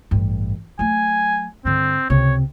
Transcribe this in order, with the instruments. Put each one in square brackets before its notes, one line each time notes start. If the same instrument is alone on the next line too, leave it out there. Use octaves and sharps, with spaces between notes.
[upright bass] A1 G2
[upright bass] F#3 A3 [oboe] G#5
[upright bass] G2 D3 [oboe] C4
[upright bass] C#2 C3 [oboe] C#5